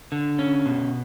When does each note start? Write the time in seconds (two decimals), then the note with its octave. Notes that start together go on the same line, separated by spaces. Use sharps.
0.12 D3
0.39 C#4
0.66 B2